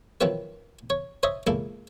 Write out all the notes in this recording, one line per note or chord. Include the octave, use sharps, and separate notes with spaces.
D#3 F3 F#3 C4 E4 B4
C#5
C5 C#5 D#5 E5
C#2 A#3 E4 A4